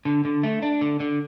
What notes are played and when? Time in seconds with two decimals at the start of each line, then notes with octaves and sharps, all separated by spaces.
0.05 D3
0.25 D3
0.43 A3
0.62 D4
0.81 D3
1.00 D3